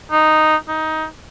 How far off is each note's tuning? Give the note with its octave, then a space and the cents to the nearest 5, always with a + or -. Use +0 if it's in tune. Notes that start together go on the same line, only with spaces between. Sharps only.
D#4 -5
D#4 +15